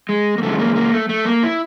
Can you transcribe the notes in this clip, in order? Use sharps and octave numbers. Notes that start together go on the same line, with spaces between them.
G#3
A#3
C#3 E3 G#3 A3
A#3
A#3
A3
A3
A#3
E4